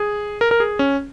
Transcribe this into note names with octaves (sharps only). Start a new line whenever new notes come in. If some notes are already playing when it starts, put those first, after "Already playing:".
Already playing: G#4
A#4
A#4
G#4
C#4